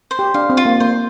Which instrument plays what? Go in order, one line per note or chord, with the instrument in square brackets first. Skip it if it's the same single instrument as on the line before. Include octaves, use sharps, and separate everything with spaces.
[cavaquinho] C5
[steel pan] G4
[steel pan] D4 [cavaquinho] F5
[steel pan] C4
[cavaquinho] F4
[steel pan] A#3
[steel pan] A#3 [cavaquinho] C5